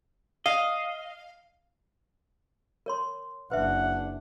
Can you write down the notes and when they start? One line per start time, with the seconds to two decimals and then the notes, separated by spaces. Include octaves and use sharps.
0.46 D#5 F5
2.86 A#4 C#5 C6
3.51 F#1 D4 B4 E5 F#5